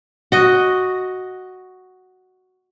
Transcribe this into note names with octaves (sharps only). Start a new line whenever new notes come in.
F#4 D#5